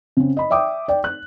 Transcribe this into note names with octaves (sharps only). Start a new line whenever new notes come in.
C#3 C4
D#5 B5
D5 E5 G5 D6 D#6
D5 G5
F#6